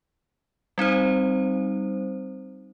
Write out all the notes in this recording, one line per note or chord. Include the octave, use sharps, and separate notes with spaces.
G3 C4 D#4 C5